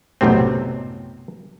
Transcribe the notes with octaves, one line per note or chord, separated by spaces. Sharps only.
B1 F#2 A2 C3 C4